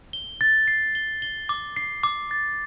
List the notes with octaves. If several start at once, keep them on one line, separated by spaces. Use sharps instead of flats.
G7
A6
C7
G7
G7
D6
C7
D6
A6